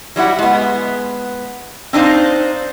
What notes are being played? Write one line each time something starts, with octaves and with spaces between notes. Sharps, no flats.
F#3 G3 E4 F#5
G#3 B3
C4 D4 D#4 C5 F5